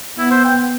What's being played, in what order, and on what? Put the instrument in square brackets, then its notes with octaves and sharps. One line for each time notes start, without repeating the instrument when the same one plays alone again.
[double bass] B3 [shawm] E4
[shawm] C5
G5